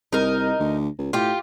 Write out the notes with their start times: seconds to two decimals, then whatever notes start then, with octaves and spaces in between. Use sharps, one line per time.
0.13 C2 D#4 A#4
0.59 D2
0.98 C#2
1.13 A2 F4 G4